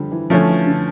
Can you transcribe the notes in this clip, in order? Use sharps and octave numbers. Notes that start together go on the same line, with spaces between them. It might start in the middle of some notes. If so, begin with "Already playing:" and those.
Already playing: D3 F3 G3
E3
D3 F3 A3 C#4
E3
D3